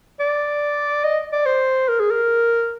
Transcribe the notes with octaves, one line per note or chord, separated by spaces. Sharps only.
D5
D#5
D5
C5
A#4
G#4
A#4